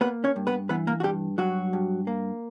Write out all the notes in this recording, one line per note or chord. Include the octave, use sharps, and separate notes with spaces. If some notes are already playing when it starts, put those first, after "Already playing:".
A#3 B3 B4
C#4 C#5
G2
B3 B4
E3 B3 B4
A#3 A#4
F#4
G2 G3 G4
G2 F#3 F#4
G2
A#3